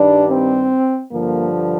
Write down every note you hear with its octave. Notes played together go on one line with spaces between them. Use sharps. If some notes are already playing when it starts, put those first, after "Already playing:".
Already playing: G2 D#3 G3 D4
C4
G2 D3 F3 A#3